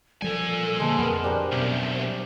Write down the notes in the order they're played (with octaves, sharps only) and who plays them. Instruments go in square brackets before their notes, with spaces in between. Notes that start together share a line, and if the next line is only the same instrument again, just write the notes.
[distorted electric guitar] A#2 G#5 [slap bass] F3 G3 [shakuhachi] A4
[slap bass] D3 A#3 [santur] G#3 C5 [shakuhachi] A5
[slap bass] F2 [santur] B3 [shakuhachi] A#4
[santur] D4 G4 A#4 [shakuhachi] C5
[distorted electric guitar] C2 F#2 [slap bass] B2